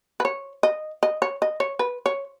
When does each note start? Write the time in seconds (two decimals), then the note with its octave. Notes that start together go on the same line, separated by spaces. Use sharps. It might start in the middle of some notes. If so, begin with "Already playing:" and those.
0.20 B4
0.25 C#5
0.63 D#5
1.03 D#5
1.22 C#5
1.42 D#5
1.60 C#5
1.79 B4
2.06 C#5